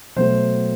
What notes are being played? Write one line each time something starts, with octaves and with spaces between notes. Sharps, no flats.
B2 F#3 A3 C5